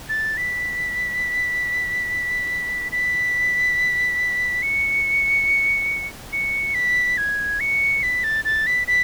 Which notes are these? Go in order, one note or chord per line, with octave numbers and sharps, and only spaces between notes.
A6
B6
B6
C#7
C#7
B6
G#6
C#7
B6
A6
A6
B6
B6